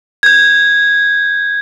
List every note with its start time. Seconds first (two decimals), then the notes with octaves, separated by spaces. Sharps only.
0.23 G6 G#6